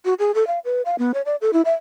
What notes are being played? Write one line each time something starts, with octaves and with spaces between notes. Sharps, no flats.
F#4
G#4
A4
F5
B4
F5
B3
C#5
D5
A4
E4
E5